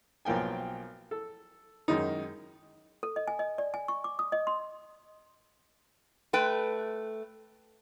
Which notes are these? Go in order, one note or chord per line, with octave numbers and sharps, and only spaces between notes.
B1 F3 A#3 G5 G#5
A4
F#2 D#3 G#3 D#4
A4
D#5
G#5
D#5
D5
G#5
C#6
D6
D#6
D#5
C6
A3 B4 G5